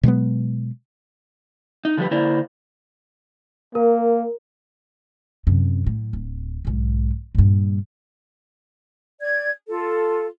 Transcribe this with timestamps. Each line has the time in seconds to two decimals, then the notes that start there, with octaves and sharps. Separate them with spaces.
0.03 B2 F#3 G#3 B3
1.85 D#4
1.97 D3 F3 G3 F4 G4 B4
2.11 D3 A#3 E4 A#4 C5 D5
3.75 A#3 A#4
5.47 F#2 C3
5.87 A2
6.13 D1
6.65 B1 G#2
7.35 G2 A#2
9.20 D5 G#6
9.68 F4 A4